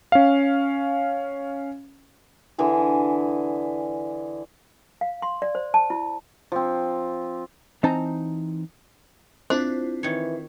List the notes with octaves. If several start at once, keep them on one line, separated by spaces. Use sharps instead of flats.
C#4 F5
D3 E3 E4 G#4
F5
C6
D5
C5
A5
E4
F3 C4
E3 C4 D#4 C5 A5 A#5
C4 D4 E4 F4 C5
D#3 E3 C#5